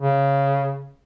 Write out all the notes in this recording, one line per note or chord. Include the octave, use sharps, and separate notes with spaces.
C#3